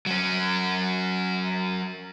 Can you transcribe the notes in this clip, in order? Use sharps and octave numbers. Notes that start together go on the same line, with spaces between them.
F#3 C#4